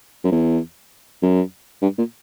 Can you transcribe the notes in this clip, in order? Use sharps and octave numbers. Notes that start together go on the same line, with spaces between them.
F#2
E2
F#2
G2
A#2